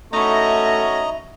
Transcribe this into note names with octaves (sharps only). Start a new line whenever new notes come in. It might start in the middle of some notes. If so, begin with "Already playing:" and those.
A3 C#4 D#4 E4 F#4 D#5 A#5 C#6